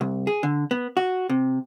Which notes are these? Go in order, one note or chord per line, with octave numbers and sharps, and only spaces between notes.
C2
G#4
D3
B3
F#4
C3